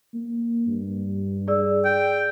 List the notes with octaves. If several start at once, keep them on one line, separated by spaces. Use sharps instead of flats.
A#3
G2
G#4 D5 E6
G5